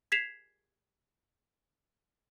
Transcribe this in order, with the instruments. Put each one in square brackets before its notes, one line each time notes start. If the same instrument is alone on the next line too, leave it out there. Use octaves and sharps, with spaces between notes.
[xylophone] G#6 B6 C7 E7 F7